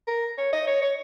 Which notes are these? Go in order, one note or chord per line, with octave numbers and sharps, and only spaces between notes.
A#4
C#5
D#5
C#5
C#5